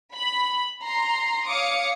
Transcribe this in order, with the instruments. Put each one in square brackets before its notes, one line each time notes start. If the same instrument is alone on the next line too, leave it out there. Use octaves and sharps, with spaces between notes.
[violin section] B5
A#5 C6
C#5 F5 D6 D#6 C#7